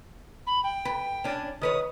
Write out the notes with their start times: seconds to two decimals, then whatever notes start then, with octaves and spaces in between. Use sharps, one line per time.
0.47 B5
0.64 G5
0.85 B4
1.24 C#4 D4
1.61 D#3 B4 C#5 D#6